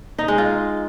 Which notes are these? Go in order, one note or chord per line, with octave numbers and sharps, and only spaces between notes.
D#4
G#3
F4